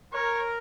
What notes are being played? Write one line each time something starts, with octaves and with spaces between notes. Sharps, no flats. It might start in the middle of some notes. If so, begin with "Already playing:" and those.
A#4 C#5